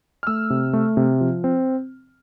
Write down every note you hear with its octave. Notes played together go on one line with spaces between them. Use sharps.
F6
A3 E6
C3
A3
C3
F3
C4